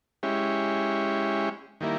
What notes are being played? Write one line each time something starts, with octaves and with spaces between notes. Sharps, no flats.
G#3 C#4 E4 G4
D#3 G3 A#3 E4